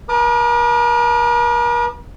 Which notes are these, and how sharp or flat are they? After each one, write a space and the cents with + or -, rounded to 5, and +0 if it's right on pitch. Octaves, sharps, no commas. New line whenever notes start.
A#4 +45 A5 +0 D6 +45